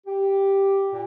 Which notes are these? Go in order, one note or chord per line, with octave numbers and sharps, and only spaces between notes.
G4
A#2